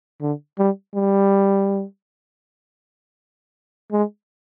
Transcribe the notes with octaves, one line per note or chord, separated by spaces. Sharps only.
D3
G3
G3
G#3